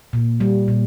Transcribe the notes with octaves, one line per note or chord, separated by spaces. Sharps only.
A#2
G3
A#2